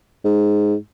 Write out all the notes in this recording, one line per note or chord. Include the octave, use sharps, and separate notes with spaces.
G#2